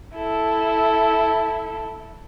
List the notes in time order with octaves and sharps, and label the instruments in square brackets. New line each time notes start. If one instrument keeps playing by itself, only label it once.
[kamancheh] E4 A4